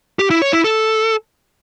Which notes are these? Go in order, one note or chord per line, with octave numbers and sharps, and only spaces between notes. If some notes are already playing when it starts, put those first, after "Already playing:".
G4
E4
C#5
E4
A4